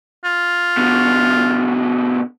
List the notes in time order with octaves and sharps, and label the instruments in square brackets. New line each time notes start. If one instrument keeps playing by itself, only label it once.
[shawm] F4
[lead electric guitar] B2 D3